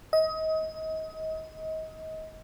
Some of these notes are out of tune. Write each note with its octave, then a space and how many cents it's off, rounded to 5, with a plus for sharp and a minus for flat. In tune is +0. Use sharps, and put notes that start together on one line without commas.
D#5 +30